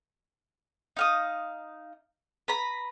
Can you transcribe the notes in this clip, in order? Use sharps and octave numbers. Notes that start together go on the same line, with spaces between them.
D#4 F5 D#6
B4 A#5 B5